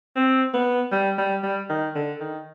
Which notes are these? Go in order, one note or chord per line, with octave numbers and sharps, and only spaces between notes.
C4
B3
G3
G3
G3
D#3
D3
D#3